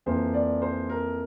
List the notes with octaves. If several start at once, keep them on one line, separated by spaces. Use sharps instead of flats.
F2 E3 A#3 C5
D5
C5
A#4